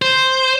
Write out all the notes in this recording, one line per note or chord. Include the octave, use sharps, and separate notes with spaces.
C5